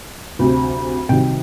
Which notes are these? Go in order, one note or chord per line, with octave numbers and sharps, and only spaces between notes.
D2 C3 F#3
C2 C3 D#3 F#3 G5